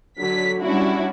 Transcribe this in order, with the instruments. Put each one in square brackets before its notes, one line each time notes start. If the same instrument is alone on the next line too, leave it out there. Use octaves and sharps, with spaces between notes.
[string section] D3 F#3 B6
G3 C#4 D4 E4 F#4